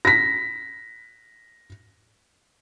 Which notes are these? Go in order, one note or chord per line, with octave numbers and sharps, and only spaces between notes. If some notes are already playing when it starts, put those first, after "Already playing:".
A#6 B6